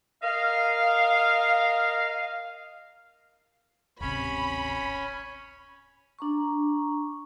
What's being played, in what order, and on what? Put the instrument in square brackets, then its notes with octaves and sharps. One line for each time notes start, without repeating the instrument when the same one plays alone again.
[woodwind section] A#4 D#5 F5
[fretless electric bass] D1 G#1 C3 [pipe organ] C#4 [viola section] B5
[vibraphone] D4 A#5 C#6